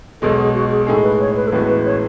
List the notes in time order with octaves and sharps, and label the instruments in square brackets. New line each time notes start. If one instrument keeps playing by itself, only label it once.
[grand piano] B1 B2 G#3 [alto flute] A4
[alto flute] G#4
F#4
G#4
[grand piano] A2 G#3 D#4 G#4 [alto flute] A4
[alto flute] B4
C#5
B4
A4
[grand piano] A1 A2 G#3 B3 F#4 [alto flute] B4
[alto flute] B4
C#5